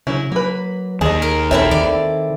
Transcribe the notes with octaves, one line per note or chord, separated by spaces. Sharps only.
C#3 F#3 C#4 E4
F#3 A#3 B4
D#2 G#4 D#5 A5
A#4
A#1 C4 E4 A4 A#4 C#5 E5
D#3 D5